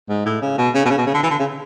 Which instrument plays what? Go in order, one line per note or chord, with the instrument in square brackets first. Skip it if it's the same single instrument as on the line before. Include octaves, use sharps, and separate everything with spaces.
[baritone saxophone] G#2
A2
C#3
B2
C#3
B2
C#3
B2
C#3
D3
E3
D3
C#3